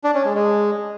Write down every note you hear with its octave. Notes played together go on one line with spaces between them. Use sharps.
D4
C#4
G#3
G#3